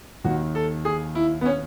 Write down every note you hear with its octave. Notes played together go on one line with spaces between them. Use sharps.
D#2 D#3 F#4
A4
G#4
E4
B3
C#4